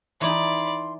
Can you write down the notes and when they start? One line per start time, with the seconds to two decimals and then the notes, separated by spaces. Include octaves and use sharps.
0.21 E3 D#4 D5 B5 C6